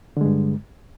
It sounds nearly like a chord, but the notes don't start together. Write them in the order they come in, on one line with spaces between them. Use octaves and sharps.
D3 G#3 G2